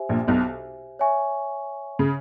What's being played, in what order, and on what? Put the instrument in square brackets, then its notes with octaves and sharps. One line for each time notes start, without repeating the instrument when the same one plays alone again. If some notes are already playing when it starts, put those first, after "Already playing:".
Already playing: [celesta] G4 C5 E5 G#5
[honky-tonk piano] A#1 A#2
B1 B2
[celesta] C#5 E5 G#5 C#6
[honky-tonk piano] C#3